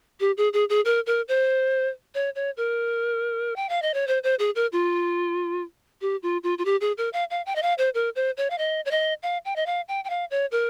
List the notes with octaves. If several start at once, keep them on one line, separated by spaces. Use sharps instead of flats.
G4
G#4
G#4
G#4
A#4
A#4
C5
C#5
C#5
A#4
G5
F5
D#5
C#5
C5
C5
G#4
A#4
F4
G4
F4
F4
F4
G4
G#4
A#4
F5
F5
G5
D#5
F5
C5
A#4
C5
C#5
F5
D#5
C#5
D#5
F5
G5
D#5
F5
G5
G5
F5
C#5
A#4